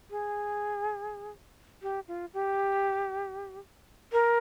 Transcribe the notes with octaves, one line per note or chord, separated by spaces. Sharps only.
G#4
G4
F4
G4
A#4